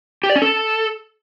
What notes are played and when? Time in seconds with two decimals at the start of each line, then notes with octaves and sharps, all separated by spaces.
0.23 G4
0.30 D5
0.36 C#4
0.42 A4